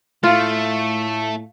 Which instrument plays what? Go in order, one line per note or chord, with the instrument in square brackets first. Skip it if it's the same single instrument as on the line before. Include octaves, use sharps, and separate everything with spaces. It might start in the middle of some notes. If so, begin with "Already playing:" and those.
[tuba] A2 [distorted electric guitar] A3 [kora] F4